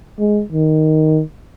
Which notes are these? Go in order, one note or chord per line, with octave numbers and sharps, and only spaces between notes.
G#3
D#3